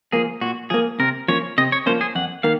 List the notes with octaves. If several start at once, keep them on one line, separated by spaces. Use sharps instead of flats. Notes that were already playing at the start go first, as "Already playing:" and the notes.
F3 A#3 G#4
A#2 F#4
F3 A#3 G#4
C3 A#4
F3 A#3 C#4 C#5
C3 D#5
C#5
F3 A#3 C#4 C5
G#4
F2 F#5
D#3 A#3 F5